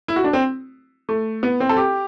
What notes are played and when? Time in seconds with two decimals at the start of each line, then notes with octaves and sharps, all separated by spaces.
0.08 E4
0.16 F#4
0.24 D4
0.33 C4
1.09 A3
1.43 B3
1.60 C4
1.69 A4
1.77 G4